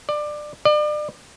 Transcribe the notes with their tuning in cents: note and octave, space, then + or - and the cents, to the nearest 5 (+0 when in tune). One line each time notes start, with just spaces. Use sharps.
D5 +20
D5 +35